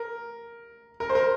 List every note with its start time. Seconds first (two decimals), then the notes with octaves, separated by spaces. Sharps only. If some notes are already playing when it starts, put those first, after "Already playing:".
Already playing: A#4
1.00 A#4
1.09 C5
1.15 A#4